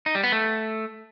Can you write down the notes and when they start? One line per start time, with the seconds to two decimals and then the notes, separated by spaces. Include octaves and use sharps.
0.06 D#4
0.15 G3
0.23 B3
0.32 A3